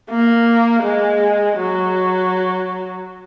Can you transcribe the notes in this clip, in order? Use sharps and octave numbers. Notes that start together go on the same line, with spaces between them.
A#3
G#3
F#3